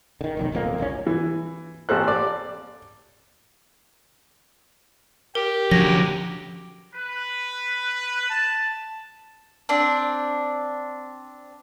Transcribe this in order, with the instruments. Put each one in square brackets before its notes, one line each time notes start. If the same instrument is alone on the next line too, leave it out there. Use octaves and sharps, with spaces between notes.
[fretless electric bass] D3 D#3
F1 B1 D#3
D1 B1 F2 A#3
F#1 C2 C3 C#4
[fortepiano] E3
A1 G4 A4 C5 F#6
D5
[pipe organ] G4 [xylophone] A#4
[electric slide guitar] D3 F#3 C#4 [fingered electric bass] F3 [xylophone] A#6
[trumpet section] B4
A5
[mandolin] C4 D4